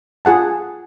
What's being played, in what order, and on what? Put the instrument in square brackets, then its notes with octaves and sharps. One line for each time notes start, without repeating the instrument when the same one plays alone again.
[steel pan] F4 G#4 F#5 A5